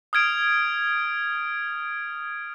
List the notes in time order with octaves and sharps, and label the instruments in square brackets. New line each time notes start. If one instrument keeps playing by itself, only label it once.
[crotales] D#6 F6 G#6 D7